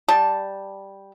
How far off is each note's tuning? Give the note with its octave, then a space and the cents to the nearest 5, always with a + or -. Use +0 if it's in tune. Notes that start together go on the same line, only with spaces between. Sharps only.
G3 +0 A5 +0